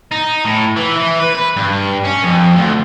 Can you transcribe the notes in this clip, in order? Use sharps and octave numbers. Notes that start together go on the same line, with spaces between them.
D#4
A2
E3
E3
B4
B4
G2
C#4
F2
D2